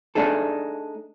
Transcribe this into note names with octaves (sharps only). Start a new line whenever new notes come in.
A3 D4 D#4 G#4 A4